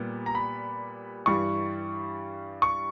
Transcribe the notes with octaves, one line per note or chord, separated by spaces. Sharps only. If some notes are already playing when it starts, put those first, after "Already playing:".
Already playing: A#2 G3 B3
A#5
B5
G2 E3 G3 C#6
C#6